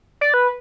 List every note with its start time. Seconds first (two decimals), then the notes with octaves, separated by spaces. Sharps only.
0.21 D5
0.34 B4